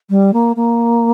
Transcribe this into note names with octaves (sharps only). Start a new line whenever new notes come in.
G3
A#3
A#3